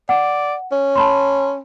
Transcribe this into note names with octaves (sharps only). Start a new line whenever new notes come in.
D5 F#5
C#4
A5 B5 C6